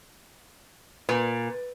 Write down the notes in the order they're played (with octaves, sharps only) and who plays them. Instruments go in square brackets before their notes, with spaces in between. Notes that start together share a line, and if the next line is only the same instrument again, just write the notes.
[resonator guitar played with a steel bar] A#2 [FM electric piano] B4